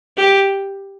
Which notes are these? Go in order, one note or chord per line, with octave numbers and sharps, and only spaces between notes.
G4